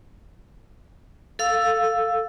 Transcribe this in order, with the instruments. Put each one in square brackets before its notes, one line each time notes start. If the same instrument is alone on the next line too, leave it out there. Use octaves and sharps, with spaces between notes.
[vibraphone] A4 F5 E6